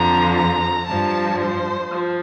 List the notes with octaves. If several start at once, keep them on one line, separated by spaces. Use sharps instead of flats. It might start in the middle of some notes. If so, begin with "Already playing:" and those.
Already playing: F2 D3 F3 A#5
A#5
G2 F3 A5
C5
F3